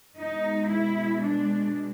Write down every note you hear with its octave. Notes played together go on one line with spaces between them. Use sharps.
B2 G#3 D#4
E4
D4